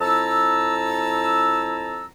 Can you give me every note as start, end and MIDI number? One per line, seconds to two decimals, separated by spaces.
0.01 2.06 41
0.01 2.06 64
0.01 2.06 81
0.01 2.06 82
0.01 2.06 88